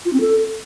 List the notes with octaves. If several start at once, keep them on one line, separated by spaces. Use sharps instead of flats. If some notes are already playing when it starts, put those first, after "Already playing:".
F4
C4
A4